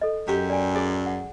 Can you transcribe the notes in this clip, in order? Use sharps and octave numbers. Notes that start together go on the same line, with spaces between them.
A4 D#5
F#2 G4
D5 G5 G#5
G#4 D5
F#5